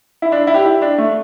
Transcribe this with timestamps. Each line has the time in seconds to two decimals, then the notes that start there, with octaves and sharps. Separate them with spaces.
0.22 E4
0.32 D4
0.47 E4
0.54 G4
0.66 E4
0.82 D4
0.98 A3